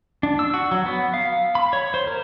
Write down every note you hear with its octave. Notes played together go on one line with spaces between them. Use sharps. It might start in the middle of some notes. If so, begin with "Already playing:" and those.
D4
E6
F#4
F#3
B3
F5
B5
C#5
C5
A#4